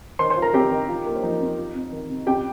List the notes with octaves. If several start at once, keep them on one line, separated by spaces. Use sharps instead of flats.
D#3 C5 C6
C5 C6
F4
A#4 A#5
C4 G4 G5
D#3
F4
A#3
C5
F3 D#4 D#5
F2
F4
C4
D#3
C3
F2 G4 G5